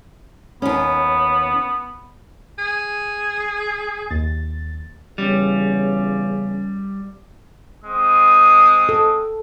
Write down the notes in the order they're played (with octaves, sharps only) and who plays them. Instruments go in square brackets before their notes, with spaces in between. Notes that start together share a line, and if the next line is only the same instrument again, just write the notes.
[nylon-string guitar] D#2 C#4 [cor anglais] B3
[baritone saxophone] G#4
[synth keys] D#2 A6
[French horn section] E2 C#3 C#4 [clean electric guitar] G3
[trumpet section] G#3 C4 D#6
[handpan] A4